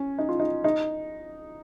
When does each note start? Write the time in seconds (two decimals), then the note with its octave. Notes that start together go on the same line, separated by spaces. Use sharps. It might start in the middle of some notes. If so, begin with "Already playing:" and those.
Already playing: C#4
0.18 D#4
0.29 F4
0.40 D#4
0.64 D#4